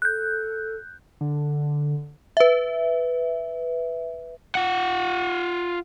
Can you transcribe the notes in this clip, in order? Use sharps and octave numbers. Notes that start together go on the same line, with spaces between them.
A4 F#6 G6
D3
B4 E5
F4 F#5